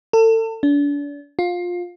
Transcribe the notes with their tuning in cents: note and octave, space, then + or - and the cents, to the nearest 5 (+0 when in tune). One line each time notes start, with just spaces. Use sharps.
A4 +35
D4 -35
F4 +20